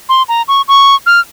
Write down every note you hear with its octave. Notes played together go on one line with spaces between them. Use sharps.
C6
A#5
C#6
C#6
F6